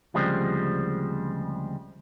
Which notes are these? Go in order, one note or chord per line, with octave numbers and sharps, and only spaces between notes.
D2 C#3 F3 G3 G#3 C4